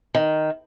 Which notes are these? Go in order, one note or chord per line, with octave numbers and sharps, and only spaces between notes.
D#3